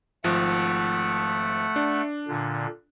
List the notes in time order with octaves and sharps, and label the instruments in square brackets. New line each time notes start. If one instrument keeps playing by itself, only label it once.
[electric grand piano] G#1 F3 F#6 [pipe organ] A3 F#5
[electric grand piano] D4
[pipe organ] A#2 D3